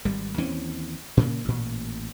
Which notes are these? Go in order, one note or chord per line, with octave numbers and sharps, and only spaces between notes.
G#1 G3
D#2 E3 C4 C#4
A#2 C#3 A#3
A1 A#2